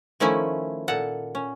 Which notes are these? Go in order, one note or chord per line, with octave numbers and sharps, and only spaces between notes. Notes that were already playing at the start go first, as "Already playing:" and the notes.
D#3 F3 A3 C#4 E4 G#5
A#2 A4 F#5
C#4